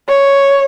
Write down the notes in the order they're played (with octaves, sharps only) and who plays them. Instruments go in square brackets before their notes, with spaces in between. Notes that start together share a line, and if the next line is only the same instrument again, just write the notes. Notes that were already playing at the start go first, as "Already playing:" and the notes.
[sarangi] C#5